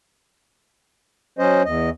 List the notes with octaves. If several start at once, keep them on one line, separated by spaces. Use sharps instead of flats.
F#3 C#4 C5 D#5
E2 D#5